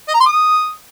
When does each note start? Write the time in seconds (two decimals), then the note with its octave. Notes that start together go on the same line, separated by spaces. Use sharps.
0.08 D#5
0.14 A#5
0.20 C6
0.26 D#6